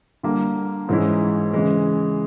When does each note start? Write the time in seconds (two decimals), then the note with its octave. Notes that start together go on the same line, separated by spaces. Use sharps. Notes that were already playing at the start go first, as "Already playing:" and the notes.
0.23 D3 G3 A#3
0.89 G#2 E3 G#3 C#4 E4
1.53 C#3 E3 G#3